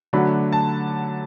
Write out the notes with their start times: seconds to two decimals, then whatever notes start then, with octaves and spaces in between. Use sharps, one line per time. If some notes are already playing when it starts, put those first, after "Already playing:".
0.13 D3 F#3 A3 D4 B5
0.52 A5